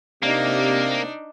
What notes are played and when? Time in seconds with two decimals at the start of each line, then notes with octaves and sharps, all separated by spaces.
0.23 C3 A#3 D4 D#4